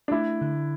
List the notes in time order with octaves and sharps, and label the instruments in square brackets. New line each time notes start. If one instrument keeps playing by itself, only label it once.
[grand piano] D4
[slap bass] A3 [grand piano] E4
[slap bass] D3